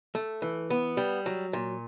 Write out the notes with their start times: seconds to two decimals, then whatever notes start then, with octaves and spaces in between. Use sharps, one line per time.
0.15 A3
0.42 E3
0.70 B3
0.97 G3
1.26 F#3
1.53 A#2